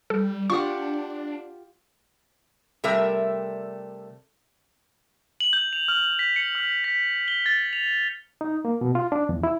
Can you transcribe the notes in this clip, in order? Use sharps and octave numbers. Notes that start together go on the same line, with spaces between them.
G3 A4
D4 F4 G4 F#5 C#6
C3 G3 A3 A#4 E5
F#7
G6
F7
F6
B6
C#7
F6
B6
G7
A6
F7
D#4
A#3
B2
F4
D4
E2
E4